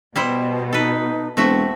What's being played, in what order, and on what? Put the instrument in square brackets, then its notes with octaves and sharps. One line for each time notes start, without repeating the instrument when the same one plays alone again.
[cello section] B2 [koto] G3 E4 C5
[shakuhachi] D#4 [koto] A4 B4
[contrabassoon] E1 [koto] A3 F#4 E5 [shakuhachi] C4